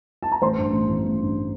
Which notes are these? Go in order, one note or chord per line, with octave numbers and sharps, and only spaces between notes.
A5
A#5
A1 C5 C6
G2
A1
E3
A1
G2